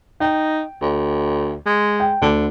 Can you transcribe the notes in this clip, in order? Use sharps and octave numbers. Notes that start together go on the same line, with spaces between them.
D#4 G5
D2
G#3
G5
D2 D3